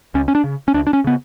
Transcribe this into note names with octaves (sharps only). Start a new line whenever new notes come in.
C#2 C#4
C#4
D4
C#3
C#4
C#2 D4
D4
C#4
C#3 B3